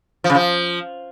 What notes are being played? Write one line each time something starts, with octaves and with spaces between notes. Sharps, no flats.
F3
C#3
F3